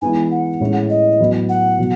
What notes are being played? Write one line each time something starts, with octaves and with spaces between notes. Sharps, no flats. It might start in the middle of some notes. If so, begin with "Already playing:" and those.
E3 G#3 B3 D#4 G#5
F#5
A2 G#3 C#4 E4
D#5
A2 F#3 B3
F#5
B2 F#3